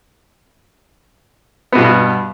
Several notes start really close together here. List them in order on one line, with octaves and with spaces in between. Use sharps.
B3 B2 G2